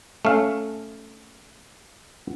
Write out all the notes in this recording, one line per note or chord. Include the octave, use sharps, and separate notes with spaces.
A3 C#4 F5